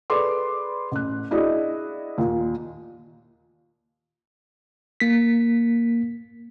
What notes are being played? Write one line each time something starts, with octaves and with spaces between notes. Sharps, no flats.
G#4 A4 B4 D5 C6 D6
A1 F#6
D4 E4 F#4 G#4 D#5
D#2 A#2
A#3 B6